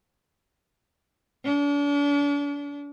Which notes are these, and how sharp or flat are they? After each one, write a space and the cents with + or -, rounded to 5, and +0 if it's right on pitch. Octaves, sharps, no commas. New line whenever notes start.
D4 -40